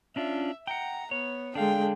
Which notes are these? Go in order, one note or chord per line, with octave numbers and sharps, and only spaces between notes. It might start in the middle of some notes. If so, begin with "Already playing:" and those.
C#4 D4 F4 E5
F#5 G5 A#5
B3 C#5
D3 G#3 D4 F5 G5